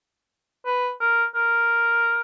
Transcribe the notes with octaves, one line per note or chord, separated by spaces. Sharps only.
B4
A#4
A#4